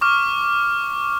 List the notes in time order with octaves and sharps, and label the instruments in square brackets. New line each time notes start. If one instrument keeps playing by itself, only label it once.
[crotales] C#6 D6 F6